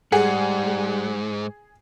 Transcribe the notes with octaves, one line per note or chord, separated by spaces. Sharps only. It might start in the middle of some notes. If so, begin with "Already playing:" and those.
G#2 G3 G#4 F#5